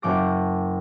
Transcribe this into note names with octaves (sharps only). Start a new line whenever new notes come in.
F#1 C#4 D6 A#6